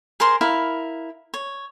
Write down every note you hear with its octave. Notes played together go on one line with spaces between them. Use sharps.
G#4 A#4 C5 C6
E4 A#4 F5
C#5